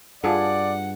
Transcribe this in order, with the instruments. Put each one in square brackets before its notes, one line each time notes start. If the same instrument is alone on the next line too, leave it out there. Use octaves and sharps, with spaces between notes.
[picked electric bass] G2 [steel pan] F4 G#4 A4 [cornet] D5 [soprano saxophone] F#5